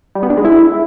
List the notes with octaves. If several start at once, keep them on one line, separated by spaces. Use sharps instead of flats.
G3
B3
D4
G#3
E4